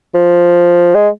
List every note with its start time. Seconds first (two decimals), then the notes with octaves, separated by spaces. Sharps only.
0.15 F3
0.95 G#3